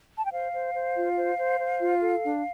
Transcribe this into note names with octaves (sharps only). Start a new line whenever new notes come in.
A5
G5
C5 F5
C5
C5
F4
C5
C5
C5
F4
A4
D4